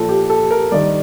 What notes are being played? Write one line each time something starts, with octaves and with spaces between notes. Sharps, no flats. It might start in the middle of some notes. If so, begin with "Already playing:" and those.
Already playing: A#2 F3 A4
G4
A4
A#4
G2 D#3 D5